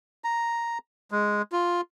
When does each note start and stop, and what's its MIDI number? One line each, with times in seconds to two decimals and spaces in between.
0.24 0.78 82
1.11 1.42 56
1.52 1.81 65